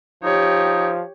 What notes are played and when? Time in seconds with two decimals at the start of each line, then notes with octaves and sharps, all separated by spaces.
0.23 F3 D#4 G4 C#5